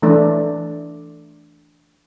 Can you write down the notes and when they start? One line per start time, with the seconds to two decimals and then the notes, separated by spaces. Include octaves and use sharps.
0.02 E3 A3 D4